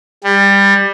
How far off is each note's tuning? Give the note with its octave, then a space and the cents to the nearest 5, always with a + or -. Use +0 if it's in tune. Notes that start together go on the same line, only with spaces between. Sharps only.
G3 +20